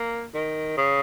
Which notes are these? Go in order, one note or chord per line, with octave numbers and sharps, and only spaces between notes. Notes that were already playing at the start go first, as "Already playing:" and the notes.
Already playing: A#3
D#3
C#3